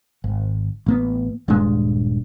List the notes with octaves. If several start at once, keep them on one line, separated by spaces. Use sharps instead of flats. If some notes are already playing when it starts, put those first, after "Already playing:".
G#1
A1 A#3 B3
D#1 G2 A#2 G#3